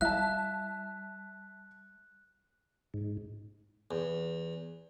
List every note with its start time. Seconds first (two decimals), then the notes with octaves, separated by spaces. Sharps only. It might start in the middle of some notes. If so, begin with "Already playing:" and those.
0.01 G3 E4 E5 F5 A5 F#6
2.94 G#2
3.91 E2